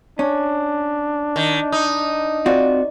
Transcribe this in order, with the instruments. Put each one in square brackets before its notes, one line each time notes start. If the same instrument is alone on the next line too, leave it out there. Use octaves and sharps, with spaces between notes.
[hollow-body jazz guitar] C#4 [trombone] D4
[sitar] D#3
[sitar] D#4 [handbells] D#6
[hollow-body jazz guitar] C4 F4 F#4 [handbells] D5